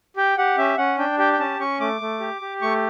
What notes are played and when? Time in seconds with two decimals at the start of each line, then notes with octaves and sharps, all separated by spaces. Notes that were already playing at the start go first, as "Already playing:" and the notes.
0.16 G4 G5
0.38 G4 F#5
0.57 C#4 E5
0.78 C#4 F#5
0.98 D4 G5
1.18 G4 G5
1.33 G5
1.39 C#4 A5
1.59 C#4 C#6
1.80 A3 D6
2.01 A3
2.20 G4
2.41 G4
2.62 A3 C#6